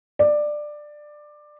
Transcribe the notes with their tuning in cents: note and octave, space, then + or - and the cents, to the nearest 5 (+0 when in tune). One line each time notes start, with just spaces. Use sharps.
D5 +15